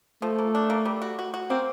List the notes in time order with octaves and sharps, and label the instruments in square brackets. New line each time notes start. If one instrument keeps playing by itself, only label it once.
[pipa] F3 [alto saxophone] A3
[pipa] A#3
D4
A#3
G3
F#4
F#4
F#4
[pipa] A#3 [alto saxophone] C4